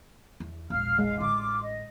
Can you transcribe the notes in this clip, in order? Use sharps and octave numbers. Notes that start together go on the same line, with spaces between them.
E2
E1 A#1 F5 F6
G#3 F5
A1 D3 F4 D6
D#5